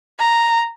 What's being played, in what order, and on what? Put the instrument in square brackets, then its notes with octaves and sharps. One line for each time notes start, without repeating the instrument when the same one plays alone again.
[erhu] A#5